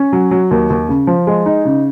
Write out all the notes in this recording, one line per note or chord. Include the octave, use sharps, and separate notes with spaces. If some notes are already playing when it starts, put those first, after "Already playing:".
Already playing: C#4
F#3
F#3
D#2
D#2
C#3
F3
G#3
D#4
C#3